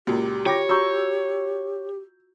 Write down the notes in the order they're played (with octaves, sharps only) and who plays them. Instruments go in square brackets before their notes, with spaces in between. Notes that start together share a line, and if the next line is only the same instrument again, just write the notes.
[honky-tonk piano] C#2 A#2 [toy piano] F#4 [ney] G4
[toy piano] F4 [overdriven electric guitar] C#5 [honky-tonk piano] G5 D6 A#6
[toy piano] F#4 A#5 C#6 [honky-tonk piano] E6 G6